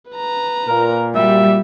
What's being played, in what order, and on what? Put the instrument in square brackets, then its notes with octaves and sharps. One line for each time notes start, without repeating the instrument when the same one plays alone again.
[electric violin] B4 A#5
[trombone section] A#2 [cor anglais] A#4
[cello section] G3 [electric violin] F#4 G4 [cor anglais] E5